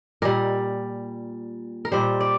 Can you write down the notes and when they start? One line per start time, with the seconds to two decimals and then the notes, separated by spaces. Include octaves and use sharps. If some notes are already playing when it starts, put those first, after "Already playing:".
0.22 A#2 G3 A#4
1.85 A#4
1.92 A#2 G3 C5
2.20 D5